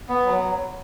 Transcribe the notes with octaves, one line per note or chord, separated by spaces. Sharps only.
B3
F#3